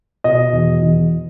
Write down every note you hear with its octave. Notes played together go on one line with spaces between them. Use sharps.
B2 D#5
E2
E2